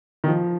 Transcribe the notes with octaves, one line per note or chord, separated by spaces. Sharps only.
D#3
F3